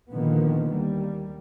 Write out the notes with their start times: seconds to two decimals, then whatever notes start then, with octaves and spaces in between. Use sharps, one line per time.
0.12 A#2 D3 D#3 F3 A#3 B3
0.72 D#2 G3 A#3